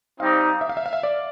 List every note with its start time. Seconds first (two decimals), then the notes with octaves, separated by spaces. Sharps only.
0.20 G3 C4 D#4 F5
0.61 E5
0.69 F5
0.77 E5
0.86 F5
0.93 E5
1.03 D5